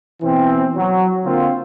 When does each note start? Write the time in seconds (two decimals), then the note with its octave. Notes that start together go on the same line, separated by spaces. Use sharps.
0.22 B2 E3 C4
0.76 F#3
1.25 D3 A#3 C4 F4